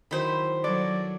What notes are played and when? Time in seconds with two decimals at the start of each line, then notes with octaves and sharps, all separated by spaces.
0.11 D#3 F#3 E4 C5 B5
0.64 F#3 A4 D5